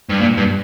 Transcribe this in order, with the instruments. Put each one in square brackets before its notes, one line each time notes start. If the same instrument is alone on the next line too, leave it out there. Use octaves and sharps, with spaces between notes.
[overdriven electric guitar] G2
A#2
G2